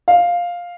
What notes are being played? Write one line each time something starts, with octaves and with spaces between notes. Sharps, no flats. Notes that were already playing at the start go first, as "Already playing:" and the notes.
F5